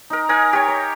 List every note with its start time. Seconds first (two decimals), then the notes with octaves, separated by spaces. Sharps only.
0.10 D#4 A#4
0.29 D#4 A#4 D#5 G#5
0.53 G4 C#5
0.68 C#5